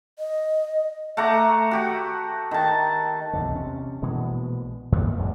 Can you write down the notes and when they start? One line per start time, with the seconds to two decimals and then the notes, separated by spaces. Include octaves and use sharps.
0.19 D#5
1.17 A3 F#5 A#5 D6
1.71 F#4 G4 F#5
2.51 D#3 A5
3.33 B1 E2 D3
3.52 C3 C#4
4.02 A#1 B2 E3 G#3
4.92 G#1 F#2 A#2 B3
5.18 E1 A#1 F#2 G#3